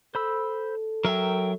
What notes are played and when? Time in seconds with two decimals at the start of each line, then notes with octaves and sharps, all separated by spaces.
0.15 A4 C5 B5 E6
1.05 F#3 A#4 E5 G5